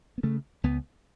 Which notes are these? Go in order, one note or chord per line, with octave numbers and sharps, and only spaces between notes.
B3
C#3 A3
C#2 B3